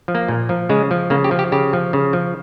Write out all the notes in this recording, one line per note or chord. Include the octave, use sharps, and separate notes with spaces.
F3
A#3
A#2
F3
C#3 G#3
F3
C#3 A#3
G4
F3
G4
C#3 G4
F3
C#3
F3